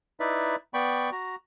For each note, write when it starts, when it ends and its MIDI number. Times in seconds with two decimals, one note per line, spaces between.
0.20 0.56 63
0.20 0.56 64
0.20 0.56 71
0.20 0.56 74
0.20 0.56 76
0.74 1.10 59
0.74 1.10 74
0.74 1.10 79
0.74 1.10 83
0.74 1.10 85
1.12 1.36 66
1.12 1.36 82